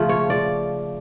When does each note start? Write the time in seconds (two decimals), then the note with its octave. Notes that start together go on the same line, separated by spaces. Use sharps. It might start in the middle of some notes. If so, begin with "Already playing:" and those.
Already playing: C#3 F3 A3
0.09 C#5
0.30 D5